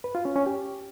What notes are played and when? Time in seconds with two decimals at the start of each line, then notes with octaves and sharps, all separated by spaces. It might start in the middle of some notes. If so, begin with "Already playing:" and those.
0.04 B4
0.15 F4
0.25 C#4
0.36 C#4
0.46 G4